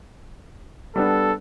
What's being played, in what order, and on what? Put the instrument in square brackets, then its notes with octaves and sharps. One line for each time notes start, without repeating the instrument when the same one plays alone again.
[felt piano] G3 B3 D4 [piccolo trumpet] A4